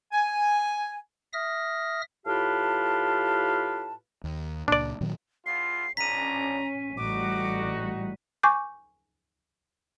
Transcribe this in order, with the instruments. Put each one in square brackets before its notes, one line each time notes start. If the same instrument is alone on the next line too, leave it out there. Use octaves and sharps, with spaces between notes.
[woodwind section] G#5
[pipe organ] E5 D#6 F6 A#6
[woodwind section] A2 F4 G4 B4 F5 A5
[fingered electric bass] D#2
[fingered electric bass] C#2 A#2 [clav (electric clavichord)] D4 D5
[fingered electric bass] A#2 D#3 F#3
[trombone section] E2 F4 [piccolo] C7
[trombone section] B1 F2 D4 [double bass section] C#4 [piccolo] A#5 [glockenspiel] B6 D#7
[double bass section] A1 A2 G3 [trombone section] D#4 F#4 [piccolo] D6
[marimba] G#5 C#6 D6 G6